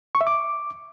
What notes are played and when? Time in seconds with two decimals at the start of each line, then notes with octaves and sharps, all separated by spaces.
0.15 C#6
0.21 E5
0.27 D6